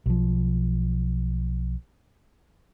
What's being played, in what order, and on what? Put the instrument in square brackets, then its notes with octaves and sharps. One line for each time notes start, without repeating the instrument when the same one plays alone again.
[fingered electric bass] B1 F3